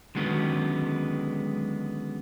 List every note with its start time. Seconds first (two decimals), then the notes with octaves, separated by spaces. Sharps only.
0.15 D3 D#3 F#3 G#3 B3 C#4